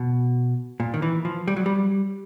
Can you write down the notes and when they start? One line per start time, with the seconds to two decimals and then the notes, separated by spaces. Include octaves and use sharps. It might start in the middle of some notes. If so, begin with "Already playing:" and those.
Already playing: B2
0.80 A#2
0.94 D#3
1.02 E3
1.25 F3
1.48 G3
1.56 F#3
1.66 G3